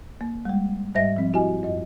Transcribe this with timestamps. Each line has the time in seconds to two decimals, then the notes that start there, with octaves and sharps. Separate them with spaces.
0.21 A#3
0.45 G3 G#3
0.95 G#2 G3 C5 D#5 E5 A#6
1.17 F3 C4
1.33 E4 F#4 G4 D#5 G#5
1.63 F#2 D#5